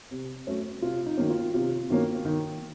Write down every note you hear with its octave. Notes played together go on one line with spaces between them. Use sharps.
C3
F#3 A3 C#4
C3 F4
D#4
D#3 F#3 A#3 C#4
F4
C3 F4
D#3 F#3 A#3 C#4
D#3